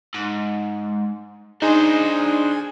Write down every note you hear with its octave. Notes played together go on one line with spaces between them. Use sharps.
G#2
D4 D#4 G#4 C5